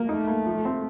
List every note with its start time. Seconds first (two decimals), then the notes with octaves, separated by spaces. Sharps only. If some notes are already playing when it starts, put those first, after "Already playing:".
Already playing: A#3
0.09 A3 D#4
0.27 A#3
0.46 F3
0.65 C4